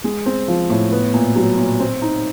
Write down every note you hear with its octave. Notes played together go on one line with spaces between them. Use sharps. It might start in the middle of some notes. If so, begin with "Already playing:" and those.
G#3
C4
F3
A2
B3
A#2
F#3
A#2
C4
D#4